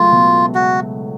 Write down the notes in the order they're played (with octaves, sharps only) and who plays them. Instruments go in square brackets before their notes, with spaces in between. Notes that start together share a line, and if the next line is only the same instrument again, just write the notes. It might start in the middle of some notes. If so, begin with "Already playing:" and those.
Already playing: [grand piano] C#2 F#3 A3 [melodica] F4
[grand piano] B2
[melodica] F#4